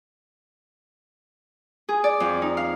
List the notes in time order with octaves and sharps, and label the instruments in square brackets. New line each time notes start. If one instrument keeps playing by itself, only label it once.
[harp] G#4
D5
F2
D#4
F5